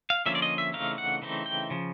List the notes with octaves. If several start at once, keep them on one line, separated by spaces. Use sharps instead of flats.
F5
D3 F3 A#3 C#4 F4 E5
D5
D#5
E5
C#3 E3 A3 C4 D#4 F5
F#5
C#3 E3 A3 C4 D#4
G5
C#3 F3